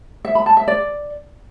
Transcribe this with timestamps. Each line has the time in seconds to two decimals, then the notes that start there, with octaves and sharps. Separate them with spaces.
0.25 E5
0.35 B5
0.46 A5
0.57 E5
0.68 D5